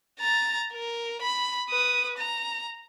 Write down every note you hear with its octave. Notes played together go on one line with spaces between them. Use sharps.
A#5 A6
A#4
B5
B4 D#6
A#5